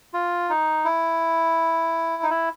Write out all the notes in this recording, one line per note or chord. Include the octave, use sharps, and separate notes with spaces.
F4
D#4
E4
D#4
E4